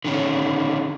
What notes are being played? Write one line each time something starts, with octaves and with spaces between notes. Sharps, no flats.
D3 D#3 C#4